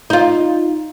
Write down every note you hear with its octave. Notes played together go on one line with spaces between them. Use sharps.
D#4 F4